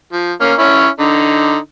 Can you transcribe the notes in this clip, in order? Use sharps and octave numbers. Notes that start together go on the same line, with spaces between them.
F3
A#3 C#4
C#4 E4 C#5
D3 D#4